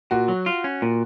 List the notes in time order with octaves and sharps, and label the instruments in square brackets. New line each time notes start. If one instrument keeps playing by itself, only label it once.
[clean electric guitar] A#2 [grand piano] F#4
[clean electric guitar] F#3
F4
C#4
A#2